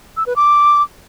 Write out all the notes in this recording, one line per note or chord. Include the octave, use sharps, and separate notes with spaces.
E6
B4
D6